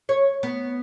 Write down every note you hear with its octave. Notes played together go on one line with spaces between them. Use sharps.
C#5
B3